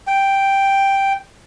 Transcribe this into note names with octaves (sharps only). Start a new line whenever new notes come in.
G5